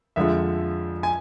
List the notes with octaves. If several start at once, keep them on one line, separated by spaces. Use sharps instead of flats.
F2 D3 F3 G#3 E5
G#5